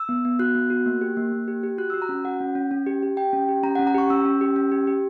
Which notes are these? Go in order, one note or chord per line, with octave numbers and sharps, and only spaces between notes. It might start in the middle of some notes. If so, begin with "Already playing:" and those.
Already playing: E6
B3
B3
F#4 F#6
B3
F#4
A#3
G4
A#3
A#3
G4
G4
F#4 F#6
F#4 E6
A#5
C#4
F#4 F#5
C#4
C#4
C#4
G4
G4
G4 G5
C#4
G4
C#4 A#5
C#4 F#5
A#5
G4 C#6
C#4 E6
C#4
G4
C#4
G4
G4